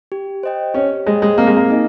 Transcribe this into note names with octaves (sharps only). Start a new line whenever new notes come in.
G4
C5 D#5 G5
C#4 G4
G#3 C5 D#5 G5
G#3
A#3 C4
G#3
A#3
D#4 G#4 D#5